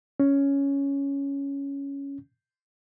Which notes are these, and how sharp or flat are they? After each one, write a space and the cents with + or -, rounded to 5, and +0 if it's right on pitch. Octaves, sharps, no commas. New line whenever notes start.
C#4 +5